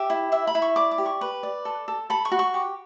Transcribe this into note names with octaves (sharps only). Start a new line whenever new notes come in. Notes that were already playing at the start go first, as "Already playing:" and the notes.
Already playing: G4 E5
E4
E4 E5
B5
E4
C#6
D5 D6
D6
G4
C#6
B4
D5
A4
A4
A4 B5
C#6
F#4
C#6
G4